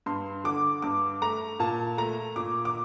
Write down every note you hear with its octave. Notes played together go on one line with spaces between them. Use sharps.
G2 C6
D3 D6
G2 D6
A3 A#5
A#2 A5
A3 A#5
A#2 D6
D6